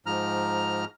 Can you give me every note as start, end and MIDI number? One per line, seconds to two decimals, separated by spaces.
0.06 0.85 44
0.06 0.85 53
0.06 0.85 82
0.06 0.85 89